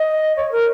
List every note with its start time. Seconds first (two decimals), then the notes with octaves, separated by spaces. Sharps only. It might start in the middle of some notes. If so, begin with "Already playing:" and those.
Already playing: D#5
0.37 C#5
0.52 A#4